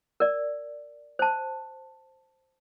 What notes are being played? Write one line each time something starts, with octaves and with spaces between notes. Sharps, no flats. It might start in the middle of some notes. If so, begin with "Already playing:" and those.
A#4 D5
C5 A5